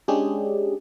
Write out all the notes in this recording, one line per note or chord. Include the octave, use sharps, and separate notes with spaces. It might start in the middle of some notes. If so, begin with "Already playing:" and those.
G#3 C#4 D4 G4 G#4